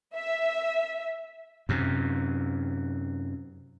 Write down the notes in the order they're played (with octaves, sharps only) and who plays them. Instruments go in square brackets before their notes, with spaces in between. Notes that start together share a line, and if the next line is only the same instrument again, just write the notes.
[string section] E5
[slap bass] F#2 C3